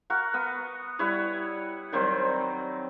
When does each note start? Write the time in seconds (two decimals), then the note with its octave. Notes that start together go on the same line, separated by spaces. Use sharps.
0.10 F#4 A#4 F#5
0.34 B3
0.99 G3 E4 B4 C#5
1.92 D#3 F#3 G3 C4